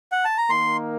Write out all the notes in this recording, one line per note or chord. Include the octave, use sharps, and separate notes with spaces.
F#5
A5
A#5
D#3 A#3 D#4 A#4 C6